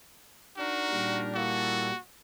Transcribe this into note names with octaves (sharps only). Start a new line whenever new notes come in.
D4 D#4 F#4 A#4
A#2 G3
A#3 E4 F#4 A4